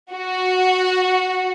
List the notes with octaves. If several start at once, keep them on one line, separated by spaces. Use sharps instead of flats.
F#4